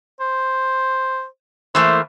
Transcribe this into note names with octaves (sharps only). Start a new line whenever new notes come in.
C5
E3 A3 A#3 C5